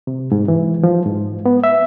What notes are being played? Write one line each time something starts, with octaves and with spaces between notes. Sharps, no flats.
C3
G#2
E3
F3
G#2
B3
E5